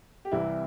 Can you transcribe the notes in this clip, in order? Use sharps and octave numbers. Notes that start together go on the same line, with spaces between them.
G4
C2 C3 E3 G3 E4